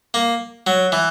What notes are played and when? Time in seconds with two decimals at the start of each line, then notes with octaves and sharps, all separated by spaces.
0.14 A#3
0.67 F#3
0.92 E3